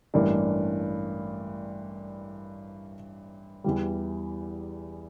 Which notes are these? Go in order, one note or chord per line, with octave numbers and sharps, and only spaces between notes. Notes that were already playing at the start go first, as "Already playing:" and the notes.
A1 G2 E3 A#3 D4
E2 E3 G3